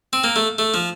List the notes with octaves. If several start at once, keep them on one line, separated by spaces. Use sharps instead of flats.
C4
A#3
A3
A3
F3